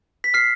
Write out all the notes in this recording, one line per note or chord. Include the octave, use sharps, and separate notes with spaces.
B6
F6 C7